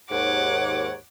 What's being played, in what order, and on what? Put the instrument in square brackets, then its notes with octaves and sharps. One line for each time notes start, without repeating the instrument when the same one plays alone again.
[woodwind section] D#2 G#2 C#5 [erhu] F#5 [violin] D6